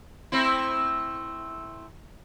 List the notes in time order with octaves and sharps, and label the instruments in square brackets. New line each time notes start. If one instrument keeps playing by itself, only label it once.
[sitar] A3 C4 E4